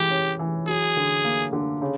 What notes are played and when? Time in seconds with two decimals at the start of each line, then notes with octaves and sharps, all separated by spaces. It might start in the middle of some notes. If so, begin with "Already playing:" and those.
Already playing: E3 G#3 G4
0.11 C#4
0.39 E3
0.67 F#3 G#4
0.96 D3
1.25 A#3
1.53 D3
1.82 C#3